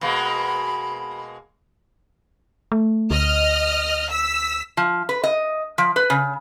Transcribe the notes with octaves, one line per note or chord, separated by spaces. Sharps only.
B2 G#3 A#3 B5
A3
D2 D#5 F6
E6 B6
F3
B4
D#5
F3
B4
C#3